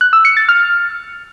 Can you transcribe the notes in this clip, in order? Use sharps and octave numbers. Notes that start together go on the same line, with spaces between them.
F#6
E6
C#7
A6
F6